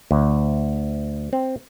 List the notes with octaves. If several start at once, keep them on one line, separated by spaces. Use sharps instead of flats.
D2
C4